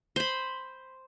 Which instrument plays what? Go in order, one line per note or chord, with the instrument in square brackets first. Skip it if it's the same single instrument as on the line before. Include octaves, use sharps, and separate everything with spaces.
[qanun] C5 B5